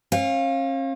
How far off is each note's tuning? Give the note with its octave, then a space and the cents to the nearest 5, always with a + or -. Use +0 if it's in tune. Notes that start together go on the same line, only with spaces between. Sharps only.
C#4 -45 F5 +0